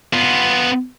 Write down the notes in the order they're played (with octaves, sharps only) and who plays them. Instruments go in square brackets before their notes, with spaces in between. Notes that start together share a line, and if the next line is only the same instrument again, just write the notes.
[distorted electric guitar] B3 F4